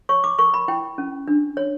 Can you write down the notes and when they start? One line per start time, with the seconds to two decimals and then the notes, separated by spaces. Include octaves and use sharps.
0.09 C#5 C#6
0.24 D6
0.39 A#4 C#6
0.54 B5
0.68 E4 G5
0.98 C#4
1.28 D4
1.57 C#5